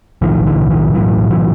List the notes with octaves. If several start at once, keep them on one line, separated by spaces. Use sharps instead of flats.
B1 A2 D#3 F3
D3 E3
D#3 F3
B1 A2 E3 F#3
E3 F#3